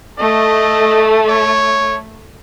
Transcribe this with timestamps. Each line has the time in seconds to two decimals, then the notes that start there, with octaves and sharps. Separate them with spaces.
0.18 A3 D#5
1.28 C#5